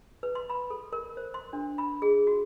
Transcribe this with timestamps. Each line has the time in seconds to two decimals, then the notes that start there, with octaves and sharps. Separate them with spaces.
0.23 B4
0.35 C6
0.50 B5
0.70 A4
0.93 A#4
1.17 C5
1.34 C6
1.53 D4
1.78 B5
2.02 G#4
2.27 F#4